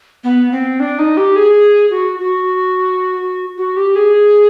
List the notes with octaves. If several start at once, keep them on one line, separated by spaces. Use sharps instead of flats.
B3
C4
D4
D#4
G4
G#4
F#4
F#4
F#4
G4
G#4